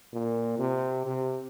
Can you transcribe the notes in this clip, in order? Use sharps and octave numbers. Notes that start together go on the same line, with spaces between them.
A#2
C3
C3